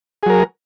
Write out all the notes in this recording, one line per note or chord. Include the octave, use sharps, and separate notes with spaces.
F#3 G#4 A#4